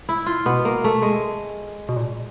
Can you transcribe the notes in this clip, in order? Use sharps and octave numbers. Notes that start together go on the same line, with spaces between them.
E4
F4
B2 B3
A#3
A3
G#3
B2
A#2